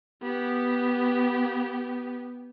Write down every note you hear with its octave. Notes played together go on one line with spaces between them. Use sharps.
B3 G4